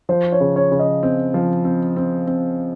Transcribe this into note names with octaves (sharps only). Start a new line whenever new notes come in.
F3 C5
C#5
C#3
C#5
C#3
D#5
C4
F3
C4
C4
C4